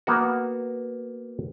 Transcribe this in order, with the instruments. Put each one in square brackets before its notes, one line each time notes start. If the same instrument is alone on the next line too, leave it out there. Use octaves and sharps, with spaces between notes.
[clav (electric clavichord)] A#3 B3 F#4